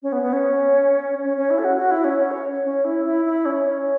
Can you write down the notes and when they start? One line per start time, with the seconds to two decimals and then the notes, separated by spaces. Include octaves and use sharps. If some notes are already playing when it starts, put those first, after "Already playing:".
0.03 C#4
0.12 B3
0.22 B3
0.33 C#4
1.23 C#4
1.37 C#4
1.50 E4
1.59 A4
1.64 F#4
1.77 F#4
1.91 E4
2.04 C#4
2.18 C#4
2.31 C#5
2.65 C#4
2.85 E4
3.05 E4
3.25 E4
3.45 C#4
3.65 C#4